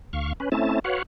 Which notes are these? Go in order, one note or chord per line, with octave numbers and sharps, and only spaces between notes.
D2 F5 C#6
C#4 B4
A3 C4 C#4 E4 A5
F#4 B4 C#5 F5 F#5